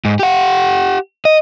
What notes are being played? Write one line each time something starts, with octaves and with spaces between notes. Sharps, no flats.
G#2
G4 F#5
D#5